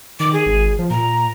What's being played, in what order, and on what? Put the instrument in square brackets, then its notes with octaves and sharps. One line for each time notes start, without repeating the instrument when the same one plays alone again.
[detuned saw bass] D#3 [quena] D6
[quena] G#4
[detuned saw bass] G#1
F3
[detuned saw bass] A#2 [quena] A#5